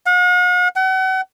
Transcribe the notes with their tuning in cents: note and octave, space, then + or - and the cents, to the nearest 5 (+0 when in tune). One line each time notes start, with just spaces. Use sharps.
F#5 -45
F#5 +35